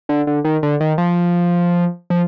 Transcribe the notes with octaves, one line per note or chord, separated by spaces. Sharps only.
D3
D3
D#3
D3
D#3
F3
F3